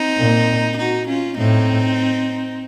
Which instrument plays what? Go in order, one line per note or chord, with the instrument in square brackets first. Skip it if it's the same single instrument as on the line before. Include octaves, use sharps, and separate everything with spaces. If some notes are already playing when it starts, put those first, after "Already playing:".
Already playing: [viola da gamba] C4 D#4
[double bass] A#2
[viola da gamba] D#4 F#4
C#4 F4
[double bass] A2 [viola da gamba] C4 D#4